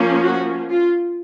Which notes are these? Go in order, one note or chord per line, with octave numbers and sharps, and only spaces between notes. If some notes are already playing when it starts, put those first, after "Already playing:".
Already playing: F3 A#3 C#4
F#4
F4